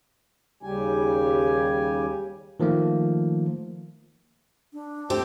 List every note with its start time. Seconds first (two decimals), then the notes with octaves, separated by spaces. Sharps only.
0.63 D#2 C#3 G3 G4 G#5
2.60 D#3 F3 A3 A#3
4.73 D4
5.10 A3 C4 G4